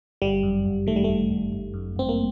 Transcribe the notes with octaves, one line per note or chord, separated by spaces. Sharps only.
G1 G3
F#2
G1
D#3 A3
G3
G1 A3
G1
G1
F#2
G1 C4
A#3